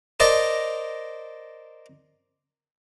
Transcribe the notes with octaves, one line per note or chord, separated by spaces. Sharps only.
A#4 C5 D5 D#5 A5 A#5